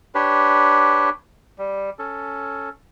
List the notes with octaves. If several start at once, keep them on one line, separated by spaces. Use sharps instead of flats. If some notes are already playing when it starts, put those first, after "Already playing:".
D4 G4 B4 C#5
G3
C#4 A4